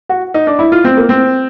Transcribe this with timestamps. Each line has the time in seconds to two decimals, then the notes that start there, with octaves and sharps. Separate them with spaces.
0.09 F#4
0.34 D#4
0.47 D4
0.59 E4
0.72 F4
0.85 C4
0.97 A#3
1.09 C4